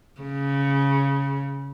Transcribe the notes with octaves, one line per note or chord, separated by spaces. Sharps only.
C#3